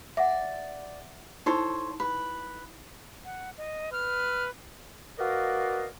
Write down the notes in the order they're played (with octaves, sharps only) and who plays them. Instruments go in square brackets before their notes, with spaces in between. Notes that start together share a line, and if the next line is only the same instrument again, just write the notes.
[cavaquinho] D5 [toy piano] E5 F#5
[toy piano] D#4 E4 [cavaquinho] A4 C5 C#5
[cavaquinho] B4
[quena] F#5
D#5
[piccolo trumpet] B4 [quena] F6
[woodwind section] F#4 A#4 B4 D5 D#5 F5